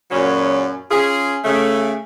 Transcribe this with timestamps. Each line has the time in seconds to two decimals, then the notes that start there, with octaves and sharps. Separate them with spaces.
0.11 F#2 A#2 C#3 F#3 C#4
0.90 C#4 F4 G#4
1.44 C#3 A3